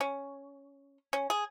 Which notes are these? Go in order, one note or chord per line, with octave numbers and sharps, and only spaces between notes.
C#4
C#4
G#4